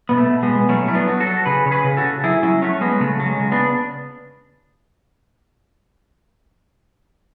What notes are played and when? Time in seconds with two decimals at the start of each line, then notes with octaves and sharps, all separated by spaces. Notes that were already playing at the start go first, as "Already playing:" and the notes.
0.09 B2 B3
0.18 A3
0.30 B2
0.43 G#3 B3
0.49 B2
0.69 F#3 A3 C#4
0.88 F#3 E4
0.95 B3 D4
1.08 F#3
1.20 F#4 A4
1.27 F#3
1.46 C#3 G#4 B4
1.66 C#3 C#5
1.71 G#4 B4
1.84 C#3
1.97 F#4 A4
2.04 C#3
2.24 F#3 E4 G#4
2.43 F#3 C#4 E4
2.62 F#3 A3 C#4
2.81 F#3 G#3 B3
3.00 C#3 A3
3.20 F#3
3.26 G#3
3.39 C#3
3.52 B3 D4